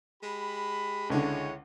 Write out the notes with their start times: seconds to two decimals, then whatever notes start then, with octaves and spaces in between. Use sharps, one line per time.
0.21 G#3 G4 B5
1.10 C#2 D3 G#3 E4 C#5